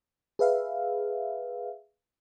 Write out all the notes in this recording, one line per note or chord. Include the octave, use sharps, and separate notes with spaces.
G#4 B4 E5 F5